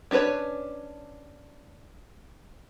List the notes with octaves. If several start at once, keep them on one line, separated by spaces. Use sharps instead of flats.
C#4 D4 A4 B4 C#5